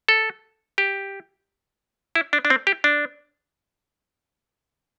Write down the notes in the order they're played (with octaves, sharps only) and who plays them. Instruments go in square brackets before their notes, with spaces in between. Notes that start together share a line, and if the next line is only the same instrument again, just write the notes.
[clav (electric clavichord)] A4
G4
E4
D4
D4
C4
G4
D4